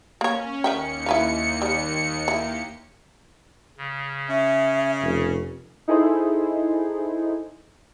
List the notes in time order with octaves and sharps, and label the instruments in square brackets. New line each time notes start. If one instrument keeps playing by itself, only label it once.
[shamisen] A#3 C#5 [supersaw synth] C#4
[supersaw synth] D#2 C#7 [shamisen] A#4 E5 G5
[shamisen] E4 B4 F5
G3
[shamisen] E3 [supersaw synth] A#3 G4
[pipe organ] C#3
[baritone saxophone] C#4 [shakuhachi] E5
[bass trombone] F1
[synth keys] D#4 E4 G#4 A4 C5